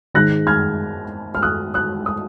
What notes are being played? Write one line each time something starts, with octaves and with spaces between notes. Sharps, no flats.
G#2 D#3 G#3 F#6 A#6
F6 G#6
F6
D#6 F#6
D#6 F#6
D#6